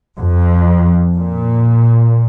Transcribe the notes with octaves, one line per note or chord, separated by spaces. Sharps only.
F2
A#2